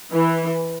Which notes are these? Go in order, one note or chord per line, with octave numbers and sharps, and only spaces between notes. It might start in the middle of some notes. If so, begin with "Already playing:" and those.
E3